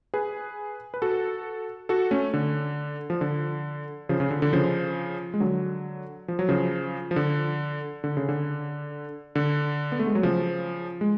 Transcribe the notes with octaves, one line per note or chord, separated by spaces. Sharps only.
G#4 B4
B4
F#4 A4
F#4 A4
A3 C#4
D3
F3
D3
C#3 F3
C#3
D3
D3
C#3 F3
G#3
D3 F#3
F3
F#3
C#3 F3
F3
D3
D3
C#3
D3
D3
B3
A3
G#3
F#3
C#3 F3
G#3